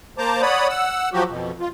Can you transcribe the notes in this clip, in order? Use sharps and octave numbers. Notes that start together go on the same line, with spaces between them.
A#3 C5 A5 A#5 D6
C#5 D5 F#5 B5 D#6
F#5 E6
F3 F#3 F#4 G4
F2 B2
F4